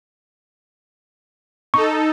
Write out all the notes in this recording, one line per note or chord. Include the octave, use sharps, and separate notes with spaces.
D#4 A4 C#6